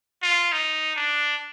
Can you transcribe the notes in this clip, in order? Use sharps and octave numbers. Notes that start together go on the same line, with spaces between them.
F4
D#4
D4